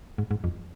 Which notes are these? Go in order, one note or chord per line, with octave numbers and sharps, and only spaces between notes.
G#2
G#2
F2